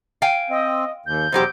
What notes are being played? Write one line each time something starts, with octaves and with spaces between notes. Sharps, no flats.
F5 G5 G#5
C4 D#5
D#2 G6
E2 B2 F#3 G4 C5